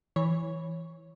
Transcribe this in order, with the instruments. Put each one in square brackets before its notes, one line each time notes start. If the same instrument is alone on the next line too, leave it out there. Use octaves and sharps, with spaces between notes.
[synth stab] E3 C#5